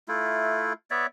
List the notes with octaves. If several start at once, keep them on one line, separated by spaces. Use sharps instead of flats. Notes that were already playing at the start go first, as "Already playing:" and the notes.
A3 E4 F4
B3 C#5 D5 E5